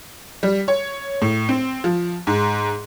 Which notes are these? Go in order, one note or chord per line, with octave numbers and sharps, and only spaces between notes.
G3
C#5
A2
C4
F3
G#2